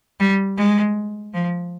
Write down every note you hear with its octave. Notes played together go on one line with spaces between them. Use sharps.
G3
G#3
F3